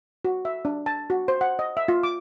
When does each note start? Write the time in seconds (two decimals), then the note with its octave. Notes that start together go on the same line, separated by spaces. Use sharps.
0.25 F#4
0.45 E5
0.65 D4
0.86 A5
1.10 F#4
1.28 C5
1.41 F#5
1.59 D#5
1.77 E5
1.88 F4
2.03 D6